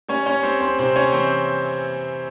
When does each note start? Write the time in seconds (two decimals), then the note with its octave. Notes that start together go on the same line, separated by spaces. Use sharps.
0.09 G3 C#4 C#5
0.26 C#4 C#5
0.43 G3 C4 C5
0.61 C4 C5
0.79 C3 C4 C5
0.96 C#4 C#5
1.13 E3 C4 C5